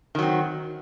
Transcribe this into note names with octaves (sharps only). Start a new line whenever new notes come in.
D#3 F#3 C4